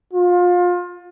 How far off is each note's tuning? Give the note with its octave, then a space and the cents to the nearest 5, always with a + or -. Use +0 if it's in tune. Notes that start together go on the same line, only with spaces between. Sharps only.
F4 +25